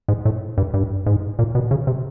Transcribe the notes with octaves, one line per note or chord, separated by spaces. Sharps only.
G#2
A2
G2
G2
G#2
A#2
B2
C#3
C3